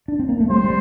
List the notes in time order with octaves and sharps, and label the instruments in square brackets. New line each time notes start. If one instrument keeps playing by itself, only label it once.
[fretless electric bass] D4
C4
A#3
A3
[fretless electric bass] G3 [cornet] C5
[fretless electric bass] G3